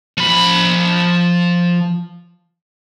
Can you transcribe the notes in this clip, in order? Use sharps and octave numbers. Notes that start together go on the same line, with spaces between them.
F3 B5